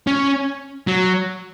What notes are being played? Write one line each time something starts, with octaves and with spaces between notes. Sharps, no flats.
C#4
F#3